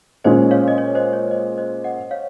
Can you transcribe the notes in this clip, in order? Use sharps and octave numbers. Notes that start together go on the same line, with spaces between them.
A#2 G#3 C#4 C5 D#5
C#5 F5
D#5
C#5
C5 D#5
C#5
C5 D#5
C5 D#5
D#5 F#5
C#5 F5